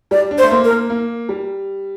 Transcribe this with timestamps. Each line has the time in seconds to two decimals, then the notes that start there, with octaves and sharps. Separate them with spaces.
0.11 G3 D5
0.31 D4
0.38 C5
0.43 A3
0.51 A#3
0.64 A#4
0.70 A#3
0.90 A#3
1.29 G3